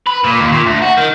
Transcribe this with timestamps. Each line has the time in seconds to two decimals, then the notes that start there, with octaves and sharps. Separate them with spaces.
0.07 B4
0.24 A#2
0.40 D#2
0.52 A#2
0.66 D2
0.82 F#4
0.98 D#3